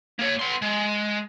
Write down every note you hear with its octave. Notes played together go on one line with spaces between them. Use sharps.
A#3 C#5
B3 C6
G#3